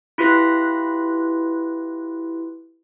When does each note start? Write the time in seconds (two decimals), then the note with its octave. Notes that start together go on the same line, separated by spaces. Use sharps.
0.18 E4 F4 G4 B4 F#6 A#6